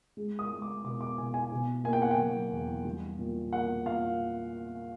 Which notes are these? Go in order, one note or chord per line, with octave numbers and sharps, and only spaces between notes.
G#3
D#6
G#3
D6
B2 D6
D6
B2 G#5
G#5
B2
A#3 G#5
G5
F#5
G5
F#3
E2
G3
A#2
A#3 F#5
A#2 F5